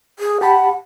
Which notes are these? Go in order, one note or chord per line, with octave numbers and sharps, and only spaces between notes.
G#4
G4 F#5 A5 B5